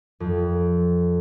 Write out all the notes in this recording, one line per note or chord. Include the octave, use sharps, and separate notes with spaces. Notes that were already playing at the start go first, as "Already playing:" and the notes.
F2